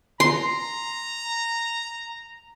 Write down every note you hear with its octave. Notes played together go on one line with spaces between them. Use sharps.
A#5 C6